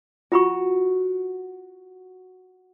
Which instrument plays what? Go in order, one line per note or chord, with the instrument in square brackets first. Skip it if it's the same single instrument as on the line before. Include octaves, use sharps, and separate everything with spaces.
[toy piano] F4 B5 C#6 [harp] F#4